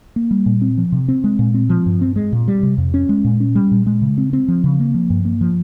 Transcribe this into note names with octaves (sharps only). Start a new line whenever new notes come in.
A#3
G3
A#2
C4
F3
C3
C4
G#3
A#2
C4
F3
G2
C4
G#3
A#2
G3
C3
F2
C#4
G#3
A#2
C#4
G3
A#2
G#3
C#3
C4
C4
F3
C#3
A#3
F3
G2
A#3
F3